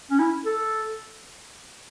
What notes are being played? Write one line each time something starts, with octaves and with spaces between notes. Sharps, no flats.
C#4
E4
A4